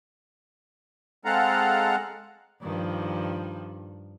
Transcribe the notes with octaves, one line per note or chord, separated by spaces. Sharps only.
G#3 C4 A4 F5 F#5 A#5
G2 D#3 F3